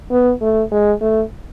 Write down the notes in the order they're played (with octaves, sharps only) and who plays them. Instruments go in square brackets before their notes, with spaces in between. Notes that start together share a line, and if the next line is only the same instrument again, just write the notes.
[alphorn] B3
A3
G#3
A3